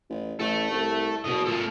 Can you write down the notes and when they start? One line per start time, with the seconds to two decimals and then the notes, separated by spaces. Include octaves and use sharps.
0.10 A1
0.39 A1 A4 E5
0.71 C2
1.25 F#1 B2 D#5
1.47 A#2 A#3 A4